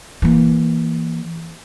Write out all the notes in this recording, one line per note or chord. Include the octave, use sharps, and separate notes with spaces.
E3 A#3